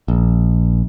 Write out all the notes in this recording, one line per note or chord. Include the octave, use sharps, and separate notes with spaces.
A#1